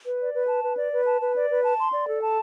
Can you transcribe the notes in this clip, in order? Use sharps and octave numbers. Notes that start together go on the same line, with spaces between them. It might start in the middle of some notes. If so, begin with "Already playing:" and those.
B4
D5
B4
A5
B4
D5
B4
A5
B4
D5
B4
A5
C6
D5
A4
A5